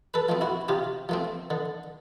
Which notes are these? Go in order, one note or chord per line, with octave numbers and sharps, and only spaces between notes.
A4 B4
F3 A3 C4
E4 F#4
C3 F4 G4
F3 A3 C4
D3